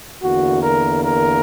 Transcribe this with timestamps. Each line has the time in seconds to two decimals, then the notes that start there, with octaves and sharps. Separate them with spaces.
0.22 E2 D3 A#3 F#4
0.63 A#4
1.03 A#4